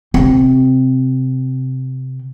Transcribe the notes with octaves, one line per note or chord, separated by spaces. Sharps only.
C3 C4